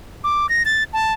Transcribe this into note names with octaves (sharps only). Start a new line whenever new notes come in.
D6
A#6
A6
A5